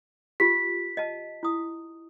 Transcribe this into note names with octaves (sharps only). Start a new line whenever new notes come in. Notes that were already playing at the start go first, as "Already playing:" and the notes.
F4 G4 B6
D#5 A5
E4 D#6